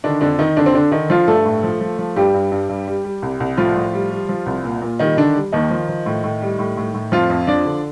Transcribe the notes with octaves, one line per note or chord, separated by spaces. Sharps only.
D3 D#3 D4
F2 D3 D4
D#3 D#4
F2 D3 D4
C4
D3 D4
D3 D#3 D#4
F3 F4
G2 A3 A4
A2
F3
F3
F3
G2 G3 G4
G2
G2
G2
G3
G3
C2
C2
A2 F3 F4
A2
G3
G3
F3
C2
A#2
A#2
D#3 G3 D#4
D3 D#3 D4
G3
D#2 D#3 D#4
F3
F3
A2
A2
G3
A2
A2
A2
F2 F3 F4
F2
F3 D4 D5
D3